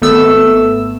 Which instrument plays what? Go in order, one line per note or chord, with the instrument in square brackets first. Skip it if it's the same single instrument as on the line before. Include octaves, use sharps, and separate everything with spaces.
[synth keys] G#1 A3 B3 E6